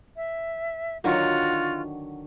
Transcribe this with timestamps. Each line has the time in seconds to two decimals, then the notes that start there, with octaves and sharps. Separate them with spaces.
0.15 E5
1.04 D3 D#3 F#3 F4 F#4